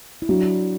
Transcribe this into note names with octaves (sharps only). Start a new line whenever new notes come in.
E4
F#3 D4